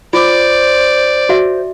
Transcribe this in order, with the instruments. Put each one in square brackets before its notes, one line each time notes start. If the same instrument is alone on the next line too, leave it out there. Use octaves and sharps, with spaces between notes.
[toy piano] F4 D6 [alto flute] C5 [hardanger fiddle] D5
[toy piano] F#4 E5